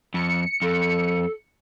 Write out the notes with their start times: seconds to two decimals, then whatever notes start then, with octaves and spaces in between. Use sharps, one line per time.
0.14 F2 C#7
0.62 F2 A4